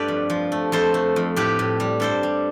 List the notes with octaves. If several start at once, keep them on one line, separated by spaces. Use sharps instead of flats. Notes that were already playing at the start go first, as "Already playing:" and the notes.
Already playing: G2 A3 G4 A4 B4 D5
F2
F3
A3
F2 A4 C5
A3
F2
A2 G4 B4
A2
G3
G2 A4 C5
G3